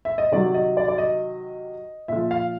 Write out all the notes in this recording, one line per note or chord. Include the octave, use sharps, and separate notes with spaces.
E5
D#5
C3 D#3 F#3 D5
D#5
D5
D5
D#5
A#2 F3 E5
F5